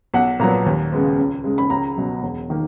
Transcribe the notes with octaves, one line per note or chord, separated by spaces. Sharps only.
B1 F#5
A#2 F#3 B3 A#5
D#2
C#3 G#3 B3
C#2
C#3 G#3
B5
C#2 A#5
B2 F#3
E1
D#3 A#3